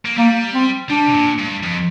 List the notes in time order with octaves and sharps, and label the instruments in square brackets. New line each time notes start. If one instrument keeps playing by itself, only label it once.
[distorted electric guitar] A#3
[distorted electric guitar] G3 [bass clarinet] A#3
[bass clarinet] C4
[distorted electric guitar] G3 [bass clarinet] D4
[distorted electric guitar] C3
A#2
G2
F2